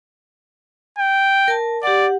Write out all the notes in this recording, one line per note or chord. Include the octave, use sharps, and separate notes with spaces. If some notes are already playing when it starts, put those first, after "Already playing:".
G5
A#4 A5
G4 D5 F#5